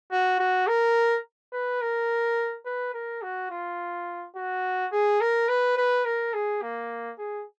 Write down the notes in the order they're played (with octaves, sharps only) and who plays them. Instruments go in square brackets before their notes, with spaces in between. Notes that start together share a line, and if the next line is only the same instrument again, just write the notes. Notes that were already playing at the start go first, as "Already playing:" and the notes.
[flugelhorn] F#4
F#4
A#4
B4
A#4
B4
A#4
F#4
F4
F#4
G#4
A#4
B4
B4
A#4
G#4
A#3
G#4